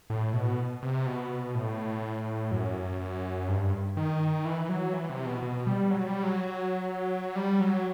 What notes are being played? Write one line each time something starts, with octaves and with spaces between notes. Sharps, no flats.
A2
B2
C3
B2
A2
F#2
F#2
G2
D#3
E3
F#3
E3
C3
B2
B2
G3
F#3
G3
F#3
G3
F#3